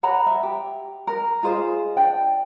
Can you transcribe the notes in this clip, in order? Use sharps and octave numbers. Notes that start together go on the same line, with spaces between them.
C#5 F#5 A#5 B5
E5
G4
A#4
F4 G#4 C5 D#5
D4 D5 G5